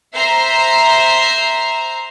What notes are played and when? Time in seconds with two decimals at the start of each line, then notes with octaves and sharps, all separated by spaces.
0.15 C5 E5 A#5 C7